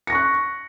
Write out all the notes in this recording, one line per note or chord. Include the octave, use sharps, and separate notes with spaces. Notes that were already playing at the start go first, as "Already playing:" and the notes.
C#6 F#6 A#6 C#7